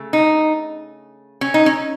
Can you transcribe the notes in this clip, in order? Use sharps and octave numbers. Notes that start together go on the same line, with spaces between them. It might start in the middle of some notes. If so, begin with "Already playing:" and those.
Already playing: C#3 A3
D#4
C#4
D#4
C#4